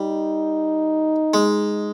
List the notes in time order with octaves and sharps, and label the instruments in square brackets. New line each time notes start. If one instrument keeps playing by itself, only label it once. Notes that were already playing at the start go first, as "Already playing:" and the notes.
Already playing: [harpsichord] G3 [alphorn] D#4
[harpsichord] G#3